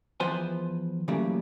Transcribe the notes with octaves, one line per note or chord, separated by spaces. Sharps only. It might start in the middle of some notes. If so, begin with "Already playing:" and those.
E2 F3 F4 B4 C5 G#5
C#3 E3 F#3 G3 A3 A#3